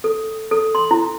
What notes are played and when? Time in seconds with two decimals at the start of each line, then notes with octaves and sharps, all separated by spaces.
0.04 A4
0.51 A4
0.75 C6
0.91 E4